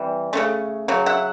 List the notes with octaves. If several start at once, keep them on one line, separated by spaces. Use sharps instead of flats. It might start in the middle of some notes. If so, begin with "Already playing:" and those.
Already playing: E3 G3 C4
C#3 E3 A3 C#4
C#3 F#3
E5 F#5